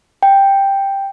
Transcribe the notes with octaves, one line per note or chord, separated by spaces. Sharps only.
G5